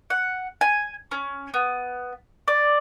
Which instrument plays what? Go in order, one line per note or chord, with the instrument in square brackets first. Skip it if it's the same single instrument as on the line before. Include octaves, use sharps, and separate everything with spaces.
[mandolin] F#5
G#5
C#4
B3
D5